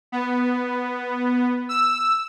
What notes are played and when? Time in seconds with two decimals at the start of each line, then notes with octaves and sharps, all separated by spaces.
0.12 B3
1.69 E6